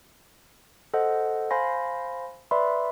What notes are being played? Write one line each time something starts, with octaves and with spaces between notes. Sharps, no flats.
A4 C5 D#5 F#5
C5 F5 G#5 B5 C6 A#6
B4 D5 E5 B5 C6